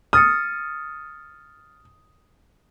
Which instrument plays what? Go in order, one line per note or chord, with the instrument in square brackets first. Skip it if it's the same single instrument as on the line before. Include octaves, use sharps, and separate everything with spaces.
[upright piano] D#6 [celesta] F6 A6 C#7